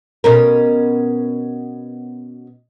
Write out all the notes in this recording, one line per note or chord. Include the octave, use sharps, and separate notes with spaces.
B2 C#4 A#4